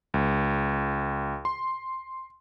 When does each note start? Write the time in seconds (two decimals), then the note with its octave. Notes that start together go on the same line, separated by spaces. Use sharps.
0.14 C#2
1.45 C6